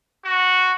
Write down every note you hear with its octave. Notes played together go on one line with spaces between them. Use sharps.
F#4